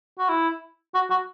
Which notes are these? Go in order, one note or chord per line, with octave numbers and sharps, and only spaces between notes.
F#4
E4
F#4
F#4